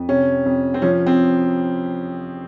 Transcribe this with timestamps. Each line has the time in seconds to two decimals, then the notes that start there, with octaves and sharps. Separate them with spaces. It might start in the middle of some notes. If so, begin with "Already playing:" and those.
Already playing: F2
0.08 C3 C#4
0.45 F2
0.74 C4
0.82 F3 C#4
1.06 C4